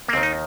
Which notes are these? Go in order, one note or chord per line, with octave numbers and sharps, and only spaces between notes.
A#3
D#2 D#3 C4
D#4